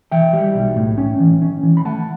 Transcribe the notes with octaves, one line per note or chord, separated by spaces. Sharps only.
E3 E5 G5
G3
B1
A2
C#4
E3
C#4
E3
B5
A3 F#5 A5